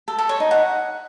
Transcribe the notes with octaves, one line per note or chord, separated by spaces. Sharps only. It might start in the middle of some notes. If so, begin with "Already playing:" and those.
A4
A4
C#5
D#4
F#5